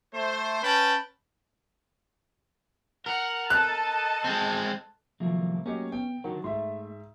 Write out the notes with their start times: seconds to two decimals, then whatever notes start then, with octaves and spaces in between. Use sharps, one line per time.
0.13 A3 C5
0.62 C#4 B4 G5 A5 B5
3.06 A#4 F#5
3.50 A4 D#5 A5 F#6
4.24 G#3 C4
5.20 C2 D#3 F3 F#3 A3 A#3
5.66 F#3 A3 A#3 C#4 G4 D#5
5.92 B3 G5
6.24 D3 D#3 F#3 F#4 A#4
6.44 G#2 A3 E5 C6